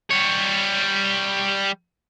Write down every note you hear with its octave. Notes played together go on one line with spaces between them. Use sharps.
G3 C#5